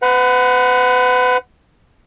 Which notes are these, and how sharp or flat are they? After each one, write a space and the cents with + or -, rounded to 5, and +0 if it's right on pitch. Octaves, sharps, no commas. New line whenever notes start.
B4 +35 F#5 +0 A#5 +45